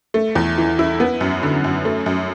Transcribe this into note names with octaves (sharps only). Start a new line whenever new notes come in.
A3
E2
E3
E4
B3
F#2
D3
F#2
A3
F#2